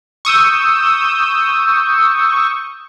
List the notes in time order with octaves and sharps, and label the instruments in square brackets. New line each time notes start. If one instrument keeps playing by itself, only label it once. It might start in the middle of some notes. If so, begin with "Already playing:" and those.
[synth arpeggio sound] C#6 D#6 E6 G6